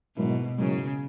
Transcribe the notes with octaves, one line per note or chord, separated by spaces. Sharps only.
G#2 B2 F#3 A#3 E4
G#2 C#3 F#3 A#3 E4